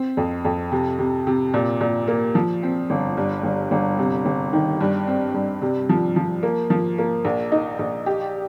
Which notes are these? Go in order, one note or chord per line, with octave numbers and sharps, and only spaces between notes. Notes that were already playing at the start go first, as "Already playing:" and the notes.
Already playing: C4
F2
F2
C3
C3
C3
A#2
A#2
A#3
F3
C4
G1
G2
G1
G1
C3
G1
D#3
G2
C4
G2
C3
F3
F3
A#3
F3
A#3
A#1
D#4
A#1
G4